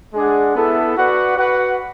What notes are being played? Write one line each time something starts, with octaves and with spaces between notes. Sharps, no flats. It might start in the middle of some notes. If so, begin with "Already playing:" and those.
G#3 D4 G#4 D5 F#5
B3 E4 A4 E5
F#4 B4 D5 F#5
F#4 B4 F#5